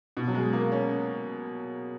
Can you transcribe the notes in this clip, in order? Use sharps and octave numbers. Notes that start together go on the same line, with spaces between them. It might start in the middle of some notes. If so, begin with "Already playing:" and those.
B2
F#3
G#3
A#3
C#4